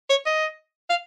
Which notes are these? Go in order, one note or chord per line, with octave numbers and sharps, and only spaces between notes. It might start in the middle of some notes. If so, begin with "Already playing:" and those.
C#5
D#5
F5